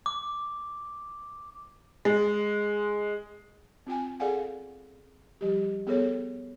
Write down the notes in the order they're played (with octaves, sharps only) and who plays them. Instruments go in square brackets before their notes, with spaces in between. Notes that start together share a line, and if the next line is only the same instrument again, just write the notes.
[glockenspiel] D6
[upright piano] G#3
[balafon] C4 F4 G5 G#5
G#4 A4 D5 F5 F#5 G#5
F3 G3 G4
B3 G#4 A4 C#5